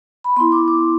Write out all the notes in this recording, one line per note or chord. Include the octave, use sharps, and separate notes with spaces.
B5
B3 E4 C6
D6
D6